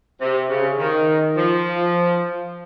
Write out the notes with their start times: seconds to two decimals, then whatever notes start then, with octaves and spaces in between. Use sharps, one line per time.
0.20 C3
0.49 C#3
0.78 D#3
1.35 F3